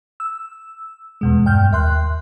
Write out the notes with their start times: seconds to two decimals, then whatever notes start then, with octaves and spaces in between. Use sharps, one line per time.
0.20 E6
1.21 E2 B2 G#3
1.46 G2 G5 F6 G6
1.72 D#2 E5 C6 F#6